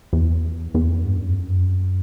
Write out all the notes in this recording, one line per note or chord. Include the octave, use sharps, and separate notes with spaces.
E2
E2
F2
G2
F#2
F2
F#2